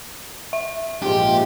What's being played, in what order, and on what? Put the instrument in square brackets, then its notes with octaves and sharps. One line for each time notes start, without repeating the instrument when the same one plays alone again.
[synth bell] E5
[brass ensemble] A#1 G#2 F4 [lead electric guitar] G4